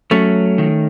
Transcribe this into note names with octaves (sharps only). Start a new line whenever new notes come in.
F#3 A3 C#4
D#3